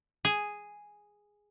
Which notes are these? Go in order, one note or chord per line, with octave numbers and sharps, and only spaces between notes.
G#4